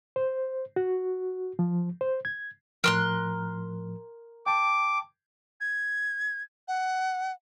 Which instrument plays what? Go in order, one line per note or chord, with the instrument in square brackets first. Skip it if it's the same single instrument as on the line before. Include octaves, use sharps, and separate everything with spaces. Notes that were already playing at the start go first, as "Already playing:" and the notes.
[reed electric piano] C5
F#4
F3
C5
G#6
[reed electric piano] A2 F3 [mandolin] A#4 C6 F#6
[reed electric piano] G5 A5 [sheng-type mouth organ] D6
[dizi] G#6
F#5